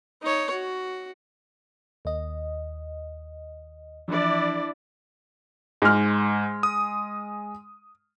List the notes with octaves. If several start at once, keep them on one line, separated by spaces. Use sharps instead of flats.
D#4 C#5
F#4
D#2 D#5
E3 F3 D4 E4 D5
G#2 G#3 F6
D#6